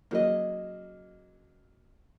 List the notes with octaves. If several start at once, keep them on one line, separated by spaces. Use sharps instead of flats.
C#3 F#3 A#3 D#5